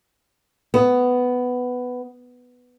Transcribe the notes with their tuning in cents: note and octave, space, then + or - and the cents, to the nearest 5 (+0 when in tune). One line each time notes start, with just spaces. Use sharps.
B3 +10